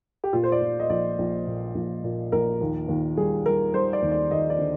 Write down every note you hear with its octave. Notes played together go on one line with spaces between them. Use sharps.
G4
A#2 F4
C5
D5
A#2
D#5
A#1 D5
A#1
A#2
A#1
A#2
A#1 A#4
D#2
D#2
G3 G#4
G3 A#4
G3 C5
D5
D#2
D5
D#2 D#5
D5
D3